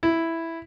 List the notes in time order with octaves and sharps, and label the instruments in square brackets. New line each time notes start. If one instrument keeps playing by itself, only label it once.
[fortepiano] E4